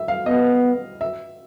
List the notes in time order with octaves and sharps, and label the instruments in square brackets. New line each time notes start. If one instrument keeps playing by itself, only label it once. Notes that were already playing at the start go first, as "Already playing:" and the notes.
Already playing: [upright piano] E5
F5
[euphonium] B3 [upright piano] D#5
[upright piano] E5